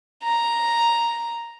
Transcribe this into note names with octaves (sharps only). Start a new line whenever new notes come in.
A#5